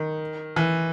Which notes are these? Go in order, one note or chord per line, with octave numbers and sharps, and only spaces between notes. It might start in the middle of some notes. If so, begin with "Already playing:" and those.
Already playing: D#3
E3